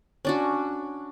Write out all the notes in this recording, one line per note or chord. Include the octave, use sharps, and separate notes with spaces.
C#4 D4 F#4